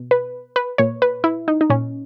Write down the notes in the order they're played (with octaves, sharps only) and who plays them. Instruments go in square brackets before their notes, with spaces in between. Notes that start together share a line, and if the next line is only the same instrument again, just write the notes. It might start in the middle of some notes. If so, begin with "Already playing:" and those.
Already playing: [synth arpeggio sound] B2
B4
B4
A#2 C#5
B4
E4
D#4
D#4
A#2 C#4